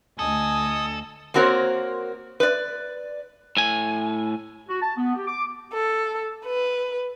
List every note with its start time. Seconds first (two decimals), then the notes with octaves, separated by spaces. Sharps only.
0.19 D2 A4 D#5 G#5 D#6
1.34 A#3 C4 F#4 A#4 C5 C#5
2.40 B4 D5
3.57 A2 G#5
4.68 F#4
4.82 A5
4.97 B3
5.15 G4
5.27 D6
5.73 A4
6.45 B4